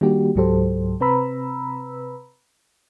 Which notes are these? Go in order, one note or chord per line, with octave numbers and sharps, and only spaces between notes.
D#3 G3 A#3 D4 F#4 G4
C#2 G#2 F#3 G4 A4 C5
C3 C4 B4 A#5 B5 E6